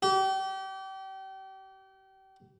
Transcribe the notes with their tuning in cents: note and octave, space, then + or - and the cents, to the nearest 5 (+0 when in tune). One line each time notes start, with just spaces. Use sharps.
G4 -35